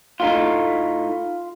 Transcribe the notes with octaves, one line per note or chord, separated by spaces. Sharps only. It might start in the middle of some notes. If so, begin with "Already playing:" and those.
A2 A3 D#4 F4